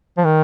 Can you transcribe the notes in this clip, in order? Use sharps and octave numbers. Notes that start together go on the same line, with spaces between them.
F3
D#3